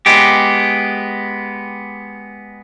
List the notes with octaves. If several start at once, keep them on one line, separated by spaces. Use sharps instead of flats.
G#3 B3 G4